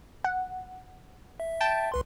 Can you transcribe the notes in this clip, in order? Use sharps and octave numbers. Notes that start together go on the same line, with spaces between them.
F#5
E5
G5 A5
C2 B4 C6